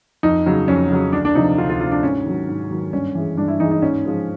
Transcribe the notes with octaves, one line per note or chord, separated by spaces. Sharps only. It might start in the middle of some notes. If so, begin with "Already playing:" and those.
F2 D#4
C#3 F#3
F2 C#4
C#3 F#3
D2 D4
D4
C3 F3 D#4
D2 F4
F4
C3 F3 F4
D4
G#2 C#4
D#3 F#3
G#2
D#3 F#3
G2 C#4
E3 G#3
G2 D4
E4
E3 G#3 D#4
D#4
G#2 C#4
F3 G#3